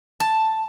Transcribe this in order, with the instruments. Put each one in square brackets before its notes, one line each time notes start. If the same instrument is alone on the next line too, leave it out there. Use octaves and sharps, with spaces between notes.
[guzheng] A5